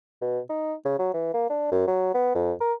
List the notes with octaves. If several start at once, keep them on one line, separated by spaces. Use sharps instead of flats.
B2
D#4
C#3
F#3
E3
A#3
D4
F#2
F#3
B3
F2
A#4